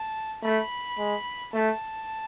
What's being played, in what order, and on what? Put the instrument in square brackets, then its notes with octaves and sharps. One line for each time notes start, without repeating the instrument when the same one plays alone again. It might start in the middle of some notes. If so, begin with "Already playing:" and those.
Already playing: [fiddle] A5
[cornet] A3 [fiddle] B5
[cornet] G#3
[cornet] A3 [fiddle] A5